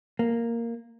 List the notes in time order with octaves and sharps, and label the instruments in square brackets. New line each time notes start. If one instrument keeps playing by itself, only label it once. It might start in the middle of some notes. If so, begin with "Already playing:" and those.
[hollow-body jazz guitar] A#3